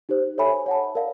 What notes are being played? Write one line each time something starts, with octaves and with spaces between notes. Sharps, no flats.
D#4 G4 C5
A4 C#5 E5 G#5 B5
C#5 F#5 A5
A#4 D5 F5